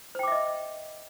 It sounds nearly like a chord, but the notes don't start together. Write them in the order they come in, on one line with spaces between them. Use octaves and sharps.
C5 G5 D6 E5 D#5